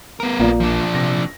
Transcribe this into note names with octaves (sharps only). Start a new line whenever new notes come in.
B3 A#4
A#1 A#3 F4 D5
F3 D4
C3 A#6